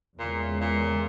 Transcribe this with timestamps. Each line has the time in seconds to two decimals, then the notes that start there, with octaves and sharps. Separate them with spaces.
0.19 E2 A#2 C#3 E3 G#3
0.61 A#2